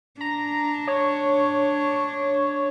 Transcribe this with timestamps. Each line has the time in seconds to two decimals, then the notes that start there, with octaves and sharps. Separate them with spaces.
0.21 D4 A#5
0.87 C#5